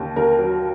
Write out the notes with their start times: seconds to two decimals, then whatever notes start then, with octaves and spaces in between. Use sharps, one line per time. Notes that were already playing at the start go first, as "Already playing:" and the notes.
Already playing: D#2 D3
0.16 D#2 A#4
0.39 F#3